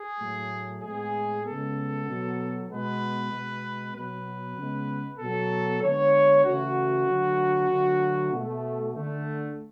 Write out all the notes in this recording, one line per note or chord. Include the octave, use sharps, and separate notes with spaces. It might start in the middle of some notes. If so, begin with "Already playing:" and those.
Already playing: G#4
A2 F#3 A3
A2 G#3 B3 G#4
C#3 G#3 B3 A4
B2 F#3 B3
B2 G#3 B3 B4
B2 G#3 B3
B2 F#3 B3 B4
C#3 G#3 B3
B2 F#3 B3 A4
D3 G#3 B3 C#5
C#3 E3 A3 F#4
D3 F#3 A3
D3 F#3 A3
B2 A3
D3 A3